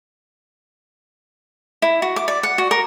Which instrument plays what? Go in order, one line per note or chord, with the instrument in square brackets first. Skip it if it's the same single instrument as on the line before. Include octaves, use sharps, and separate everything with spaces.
[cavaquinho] E4
F#4
D6
D5
F#5
F#4
A#4